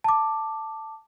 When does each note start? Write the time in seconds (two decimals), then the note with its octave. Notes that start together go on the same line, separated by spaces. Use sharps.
0.04 A5 D6